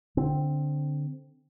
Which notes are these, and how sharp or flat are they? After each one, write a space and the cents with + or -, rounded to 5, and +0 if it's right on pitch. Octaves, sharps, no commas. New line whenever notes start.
D3 +0 C4 +0